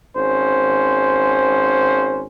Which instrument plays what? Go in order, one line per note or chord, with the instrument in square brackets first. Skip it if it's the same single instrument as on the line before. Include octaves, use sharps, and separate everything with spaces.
[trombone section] G#1 C#4 C5